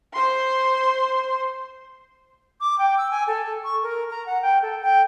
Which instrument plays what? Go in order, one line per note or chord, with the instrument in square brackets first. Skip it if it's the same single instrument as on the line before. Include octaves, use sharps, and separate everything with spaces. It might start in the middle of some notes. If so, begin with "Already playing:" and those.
[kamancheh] C5 C6
[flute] D6
G5
E6
G#5
A4
C#6
A#4
A#5
F#5
G5
A4
G5